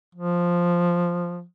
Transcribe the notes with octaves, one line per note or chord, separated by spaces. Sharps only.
F3